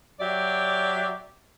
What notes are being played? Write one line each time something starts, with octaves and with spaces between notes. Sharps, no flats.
F#3 G4 D5 E5